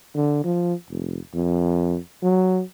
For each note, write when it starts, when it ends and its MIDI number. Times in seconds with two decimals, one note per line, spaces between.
0.15 0.40 50
0.44 0.74 53
0.90 1.18 29
1.34 1.98 41
2.23 2.62 54